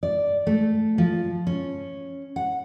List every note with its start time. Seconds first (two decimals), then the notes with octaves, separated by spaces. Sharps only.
0.03 D5
0.47 A3
0.98 F3
1.47 C#4
2.36 F#5